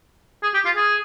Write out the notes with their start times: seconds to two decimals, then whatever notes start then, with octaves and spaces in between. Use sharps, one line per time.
0.43 G#4
0.54 G4
0.65 F4
0.76 G#4